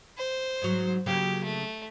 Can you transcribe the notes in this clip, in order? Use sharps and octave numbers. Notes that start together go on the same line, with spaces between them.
C5
G#2 F#3
C#3 F#3 A#3 G4
A3